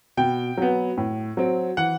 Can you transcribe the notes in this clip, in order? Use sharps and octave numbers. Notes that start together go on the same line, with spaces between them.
B2 G5
F#3 B3
A2
F#3 C4
E3 F#5